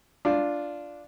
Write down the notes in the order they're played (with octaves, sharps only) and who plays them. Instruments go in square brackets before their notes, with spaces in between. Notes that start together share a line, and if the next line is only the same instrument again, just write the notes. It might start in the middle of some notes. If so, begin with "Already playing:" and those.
[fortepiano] D4 F4